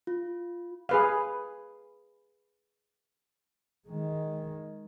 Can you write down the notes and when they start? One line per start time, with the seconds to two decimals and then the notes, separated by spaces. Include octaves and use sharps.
0.07 F4
0.89 G#4 B4 F5
3.89 D#3 G#3